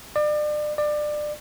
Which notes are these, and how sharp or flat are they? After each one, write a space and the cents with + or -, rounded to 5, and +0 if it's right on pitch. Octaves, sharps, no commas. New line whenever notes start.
D5 +35
D5 +25